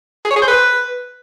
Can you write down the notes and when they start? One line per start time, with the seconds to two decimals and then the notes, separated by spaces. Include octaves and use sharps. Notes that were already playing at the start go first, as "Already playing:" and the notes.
0.25 G#4
0.31 C#5
0.36 G#4
0.42 C5
0.48 B4